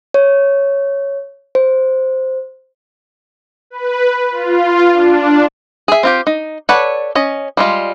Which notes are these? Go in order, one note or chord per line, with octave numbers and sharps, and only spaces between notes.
C#5
C5
B4
F4
D4
G#4 E5
C4 F4 G4
D#4
A4 B4 C#5 D5 F#5
C#4 D#5
G3 G#3 F4